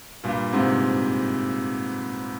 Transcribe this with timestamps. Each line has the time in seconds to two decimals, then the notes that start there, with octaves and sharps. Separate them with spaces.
0.24 G2 A#2
0.53 G#2 C3